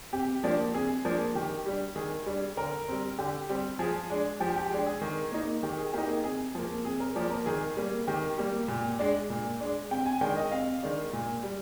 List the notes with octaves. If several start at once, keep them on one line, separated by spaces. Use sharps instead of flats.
C3 G4
F3 A#3 D4
C3 G#4
F3 A#3 D4
D#3 G4
G3 D4
D#3 G#4
G3 D4
D3 A#4
G3 C4
D3 G4
G3 C4
F3 G#4
G#3 D4
F3 G4
G4
G#3 D4
G#4
D#3
A#3 D#4
D#3 G4
G#4
A#3 D#4 G4
G#4
C3 G#4
F3 A#3
C3 G#4
A#4
F3 A#3 D5
A#4
D#3 G#4
G3 A#3
D#3 G4
G3 A#3
A#2
G#3 D4
A#2
G#3 D4
C3 G5
G#5
D#3 G#3 D4 G5
D#5
C3 F5
D#3 G#3 D4
A#2
G3